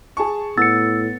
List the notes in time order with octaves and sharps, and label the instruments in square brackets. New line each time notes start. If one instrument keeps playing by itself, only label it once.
[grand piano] G#4 A5 C#6
[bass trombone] A2 [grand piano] B3 [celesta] E6 [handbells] A6 C#7